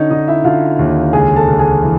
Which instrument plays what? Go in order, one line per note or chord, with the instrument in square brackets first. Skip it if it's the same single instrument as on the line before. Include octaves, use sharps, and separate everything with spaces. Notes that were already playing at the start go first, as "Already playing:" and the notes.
Already playing: [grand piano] D3 C#4 D#4 C#5 D#5
D3 D#4 D#5
E4 E5
D3 F4 F5
D#2
C#2 G#4 G#5
A4 A5
C#2
G#4 G#5
E3